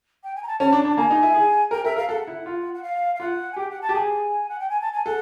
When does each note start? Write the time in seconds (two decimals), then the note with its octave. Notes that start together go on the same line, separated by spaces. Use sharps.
0.23 G5
0.36 G#5
0.42 A#5
0.47 A5
0.60 C#4 A5
0.72 D4
0.85 D4
0.90 A5
0.97 A#3 G#5
1.10 D#4
1.23 E4
1.34 G#4
1.71 A#4 G5
1.84 A#4 E5
1.96 A#4 F5
2.08 A4 F#5
2.27 E4
2.46 F4
2.74 F#5
2.83 F5
3.15 F5
3.20 F4 F#5
3.52 G#5
3.56 G4 G5
3.70 F#5
3.81 A5
3.89 G4
3.95 G#4 G#5
4.49 F#5
4.59 G5
4.69 G#5
4.81 A5
4.93 G#5
5.06 A4 F#5